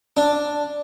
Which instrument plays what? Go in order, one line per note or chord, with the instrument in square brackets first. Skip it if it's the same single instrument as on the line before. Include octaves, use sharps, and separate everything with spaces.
[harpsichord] D4